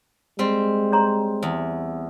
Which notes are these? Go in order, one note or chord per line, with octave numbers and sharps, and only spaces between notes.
G3 G#3 C4
C#5 A#5 C6
E2